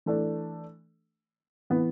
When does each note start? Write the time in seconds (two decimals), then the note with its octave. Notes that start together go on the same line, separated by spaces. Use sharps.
0.06 E3 A3 D4
1.70 E3 B3